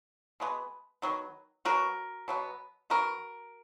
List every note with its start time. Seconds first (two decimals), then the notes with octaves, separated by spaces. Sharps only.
0.40 B2 G#3 B3
1.02 D#3 F#3 B3
1.65 B2 F#3 B3 F#4 A#4
2.28 B2 F#3 B3
2.90 D#3 G#3 B3 F#4 A#4